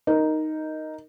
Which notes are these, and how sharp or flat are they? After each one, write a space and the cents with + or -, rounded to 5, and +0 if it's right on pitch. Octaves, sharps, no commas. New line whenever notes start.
D#4 +0 A#4 +0